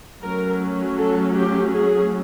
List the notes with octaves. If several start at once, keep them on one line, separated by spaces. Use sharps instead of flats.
F#3 A3 C#4 A#4
A4
G4
G#4